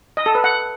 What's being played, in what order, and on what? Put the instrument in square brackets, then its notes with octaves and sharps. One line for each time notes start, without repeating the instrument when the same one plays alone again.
[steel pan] D#5
A4
B4
F#5